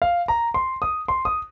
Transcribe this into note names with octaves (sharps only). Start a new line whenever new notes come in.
F5
A#5
C6
D#6
C6
D#6